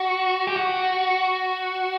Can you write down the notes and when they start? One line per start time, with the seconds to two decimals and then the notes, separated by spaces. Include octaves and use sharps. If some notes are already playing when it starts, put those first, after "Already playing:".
Already playing: F#4
0.47 G4
0.56 F#4